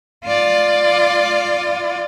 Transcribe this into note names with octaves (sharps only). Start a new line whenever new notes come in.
F4 D5